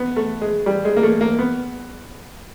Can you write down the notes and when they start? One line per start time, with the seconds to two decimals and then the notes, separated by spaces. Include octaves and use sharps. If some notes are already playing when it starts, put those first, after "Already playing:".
Already playing: B3
0.16 A3
0.41 G#3
0.66 G3
0.85 G#3
0.97 A#3
1.03 A3
1.21 A#3
1.39 B3